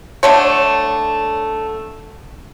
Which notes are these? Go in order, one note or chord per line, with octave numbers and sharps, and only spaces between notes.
D3 A3 C#5